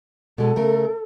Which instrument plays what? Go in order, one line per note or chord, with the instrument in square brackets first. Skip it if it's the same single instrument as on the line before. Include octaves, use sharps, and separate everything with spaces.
[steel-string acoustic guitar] B2 G#3 [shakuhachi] A4
[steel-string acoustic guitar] C#3 A3 A#4